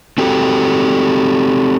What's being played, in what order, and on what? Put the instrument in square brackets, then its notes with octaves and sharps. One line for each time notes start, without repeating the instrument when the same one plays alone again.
[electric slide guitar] C4 F#4 G4 A4